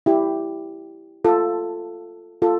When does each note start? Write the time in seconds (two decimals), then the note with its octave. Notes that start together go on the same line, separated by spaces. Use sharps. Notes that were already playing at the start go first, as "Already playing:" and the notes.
0.06 E4 G4
1.24 F4 A4
2.42 F4 A4